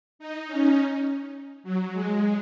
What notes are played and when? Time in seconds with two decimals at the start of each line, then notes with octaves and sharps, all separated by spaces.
0.19 D#4
0.48 C#4
1.63 F#3
1.93 G#3